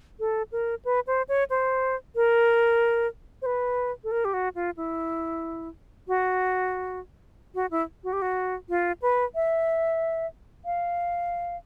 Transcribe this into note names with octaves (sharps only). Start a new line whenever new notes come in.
A4
A#4
B4
C5
C#5
C5
A#4
C5
B4
A4
A#4
G4
F#4
F4
E4
F#4
F#4
E4
F#4
G4
F#4
F4
B4
E5
F5